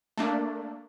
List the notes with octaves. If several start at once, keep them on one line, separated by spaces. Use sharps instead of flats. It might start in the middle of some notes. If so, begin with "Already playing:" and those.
A3 A#3 D4